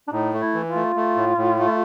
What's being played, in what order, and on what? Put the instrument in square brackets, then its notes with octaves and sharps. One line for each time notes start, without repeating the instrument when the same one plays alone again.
[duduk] D4
[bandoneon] A2 [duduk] D#4
[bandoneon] A3
[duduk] E4
[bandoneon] E3
[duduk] F4
[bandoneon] A3
A3
A2
A2
A3